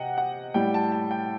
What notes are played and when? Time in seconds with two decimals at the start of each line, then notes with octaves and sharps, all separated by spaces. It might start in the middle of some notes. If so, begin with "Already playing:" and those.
Already playing: C3 D#5 F#5 G5
0.18 F#5
0.54 A2 G3 G5
0.74 A5
0.92 A5
1.11 G5